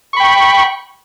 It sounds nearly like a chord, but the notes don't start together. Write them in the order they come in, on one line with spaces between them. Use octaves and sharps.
C#6 B5 G5